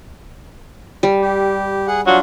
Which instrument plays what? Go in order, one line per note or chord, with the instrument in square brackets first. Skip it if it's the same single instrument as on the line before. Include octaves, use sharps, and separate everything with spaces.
[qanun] G3
[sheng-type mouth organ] G4
G#4 F#5
[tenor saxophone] F#3 [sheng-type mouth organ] D4 F4